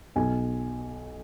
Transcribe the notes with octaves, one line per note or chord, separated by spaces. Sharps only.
B1 G#5